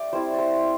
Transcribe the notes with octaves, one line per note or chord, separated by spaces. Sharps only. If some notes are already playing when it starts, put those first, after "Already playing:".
Already playing: A3 G4 D5
G3 C4 E4 C5
D5
C5